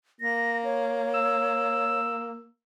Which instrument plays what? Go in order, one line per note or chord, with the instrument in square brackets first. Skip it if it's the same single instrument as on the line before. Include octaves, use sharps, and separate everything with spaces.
[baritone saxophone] A#3 [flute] A#6
[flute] C#5
[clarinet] E6